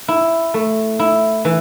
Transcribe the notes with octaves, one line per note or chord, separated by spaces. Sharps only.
E4
A3
E4
E3